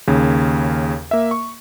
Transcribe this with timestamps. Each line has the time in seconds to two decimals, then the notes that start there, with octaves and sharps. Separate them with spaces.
0.07 D#2 C#3
1.11 A#3 E5
1.31 C#6